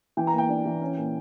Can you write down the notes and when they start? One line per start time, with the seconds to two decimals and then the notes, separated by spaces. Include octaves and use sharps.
0.17 E3 G5
0.27 A#5
0.33 A#3
0.38 G5
0.49 D4
0.66 E3
0.81 C#4
0.98 A#2